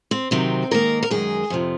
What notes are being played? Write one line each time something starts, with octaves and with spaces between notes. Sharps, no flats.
C4
C3 D#3 F#3 C4
G#2 D#3 A#3 A#4
A#4
F#2 D#3 G#3 G#4
F2 C3 F3